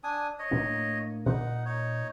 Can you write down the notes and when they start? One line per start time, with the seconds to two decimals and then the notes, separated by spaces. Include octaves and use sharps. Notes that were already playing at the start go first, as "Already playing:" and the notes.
0.04 D4 G#5 D#6
0.39 C#5 D#5
0.51 A2 A#3 D4
1.26 A#2 D#4 F#5
1.65 D#4 C#5